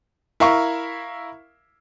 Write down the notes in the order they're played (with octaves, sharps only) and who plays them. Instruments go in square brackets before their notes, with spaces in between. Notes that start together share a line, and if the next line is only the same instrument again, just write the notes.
[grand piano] E4 A#4 E5 F5 C#6